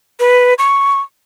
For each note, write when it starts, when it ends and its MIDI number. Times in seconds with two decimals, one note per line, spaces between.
0.20 0.54 71
0.59 1.00 85